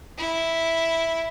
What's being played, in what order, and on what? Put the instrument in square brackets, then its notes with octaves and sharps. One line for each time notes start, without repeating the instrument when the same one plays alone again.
[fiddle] E4